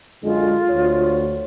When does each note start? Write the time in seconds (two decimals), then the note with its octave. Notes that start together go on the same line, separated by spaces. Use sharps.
0.23 F#2 D3 G#3 F4
0.70 D2 C#5